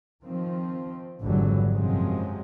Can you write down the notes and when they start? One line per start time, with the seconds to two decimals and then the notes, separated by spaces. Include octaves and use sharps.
0.23 D#3 F3 C4
1.23 G#1 F2 D3 E3 F#3 G3
1.73 F#2 C3 F3 F#3 G#3 C4